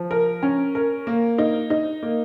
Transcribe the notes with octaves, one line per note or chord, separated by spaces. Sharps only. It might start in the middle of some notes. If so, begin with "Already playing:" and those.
Already playing: F3
A#4
C#4
A#4
A#3
D#4
D#4
A#3